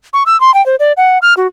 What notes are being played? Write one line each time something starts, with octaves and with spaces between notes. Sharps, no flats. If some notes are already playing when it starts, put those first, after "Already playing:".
C#6
E6
C6
G5
C5
D5
F#5
F6
F#4